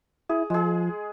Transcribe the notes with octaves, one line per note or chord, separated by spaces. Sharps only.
E4 G#4
F3 G#3 G#4